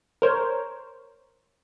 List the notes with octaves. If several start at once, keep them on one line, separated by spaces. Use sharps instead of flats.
A#4 C5 C#5